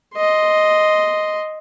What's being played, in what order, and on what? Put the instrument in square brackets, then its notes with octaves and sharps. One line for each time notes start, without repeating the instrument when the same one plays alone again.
[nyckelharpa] D#5 C6